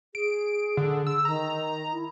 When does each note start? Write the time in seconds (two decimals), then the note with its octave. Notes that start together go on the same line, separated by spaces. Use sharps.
0.15 G#4 D7
0.77 D3
1.07 E6
1.25 D#3 A#5
1.93 E4